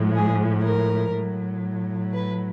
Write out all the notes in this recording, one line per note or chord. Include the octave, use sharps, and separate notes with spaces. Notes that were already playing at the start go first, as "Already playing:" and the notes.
Already playing: A2 F3 G#3
G#4
A#4
A2 F#3
B4